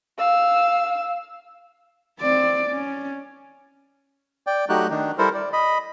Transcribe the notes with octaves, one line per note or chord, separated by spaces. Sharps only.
F5 E6
C4 D5
C#4
D5 G5
F#3 A3 D#4 F#4 G4 F#6
D#3 D4 D#4
G3 E4 A4 A#4 C5
D5
D#5 B5